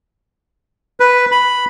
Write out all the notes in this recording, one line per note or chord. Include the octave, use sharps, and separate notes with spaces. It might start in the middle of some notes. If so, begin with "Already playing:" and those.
B4
B5